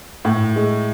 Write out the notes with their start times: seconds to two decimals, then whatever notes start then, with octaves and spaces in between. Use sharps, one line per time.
0.25 A2
0.56 G#3